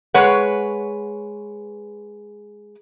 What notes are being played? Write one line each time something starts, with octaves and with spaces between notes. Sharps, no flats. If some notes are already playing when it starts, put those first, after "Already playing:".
G#3 B4 C#5 F#5